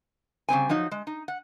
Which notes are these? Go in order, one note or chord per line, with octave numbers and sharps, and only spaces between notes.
C#3 G3 C4 G#5
F3 F#3 D#4
G#3
D#4
F#5